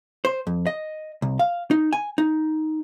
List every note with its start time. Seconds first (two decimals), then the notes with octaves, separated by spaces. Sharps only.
0.25 C5
0.47 F2
0.67 D#5
1.22 C2
1.39 F5
1.71 D#4
1.93 G#5
2.18 D#4